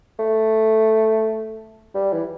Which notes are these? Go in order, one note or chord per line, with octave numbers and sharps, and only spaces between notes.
A3
G3
E3